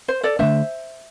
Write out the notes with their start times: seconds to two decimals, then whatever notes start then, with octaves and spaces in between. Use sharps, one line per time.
0.08 C5
0.23 A4 D5
0.39 D3 A3 D4 C5 E5